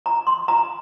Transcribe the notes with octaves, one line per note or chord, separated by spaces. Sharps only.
A#5
C6
A#5